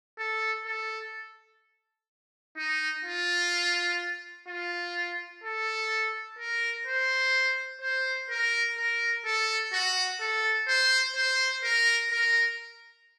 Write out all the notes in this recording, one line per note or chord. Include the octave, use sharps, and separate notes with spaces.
A4
A4
D#4
F4
F4
A4
A#4
C5
C5
A#4
A#4
A4
F#4
A4
C5
C5
A#4
A#4